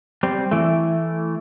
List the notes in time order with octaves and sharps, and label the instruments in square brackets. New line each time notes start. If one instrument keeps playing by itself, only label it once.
[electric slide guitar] G3 C4
E3 A3